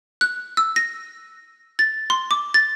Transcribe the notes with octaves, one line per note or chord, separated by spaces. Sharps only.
F#6
E6
A#6
A6
C6
D6
A6